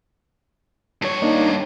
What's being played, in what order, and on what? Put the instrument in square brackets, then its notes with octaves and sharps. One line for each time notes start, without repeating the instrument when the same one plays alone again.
[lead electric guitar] G2 C#5
[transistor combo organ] A#3 D4 D#4